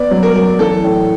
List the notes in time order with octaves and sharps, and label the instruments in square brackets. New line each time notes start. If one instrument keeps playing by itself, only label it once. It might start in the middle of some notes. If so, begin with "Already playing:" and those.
Already playing: [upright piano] B3 D5
F#3
A#4
F#3
E3 A4
A2